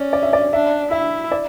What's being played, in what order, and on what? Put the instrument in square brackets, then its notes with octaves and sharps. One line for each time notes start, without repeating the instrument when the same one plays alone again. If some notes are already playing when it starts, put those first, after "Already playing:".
Already playing: [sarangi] C#4 [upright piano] D5
[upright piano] D5
E5
D5
[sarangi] D4 [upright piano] E5
[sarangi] E4 [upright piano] E5
[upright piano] D5